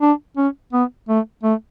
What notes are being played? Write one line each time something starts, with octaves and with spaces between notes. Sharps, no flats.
D4
C#4
B3
A3
A3